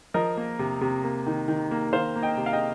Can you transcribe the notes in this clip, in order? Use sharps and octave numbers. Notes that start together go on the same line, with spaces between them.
F3 A#4 D#5
A#3
C3
C3
A#3
D#3
D#3
A#3
D#3 C5 F5
A#3
D#5 G5
C3
F5
D#5 G5